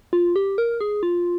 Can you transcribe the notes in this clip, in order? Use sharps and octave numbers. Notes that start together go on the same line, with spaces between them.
F4
G4
A#4
G#4
F4